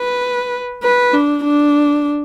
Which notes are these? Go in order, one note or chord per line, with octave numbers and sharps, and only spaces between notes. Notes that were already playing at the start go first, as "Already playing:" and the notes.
Already playing: B4
B4
D4
D4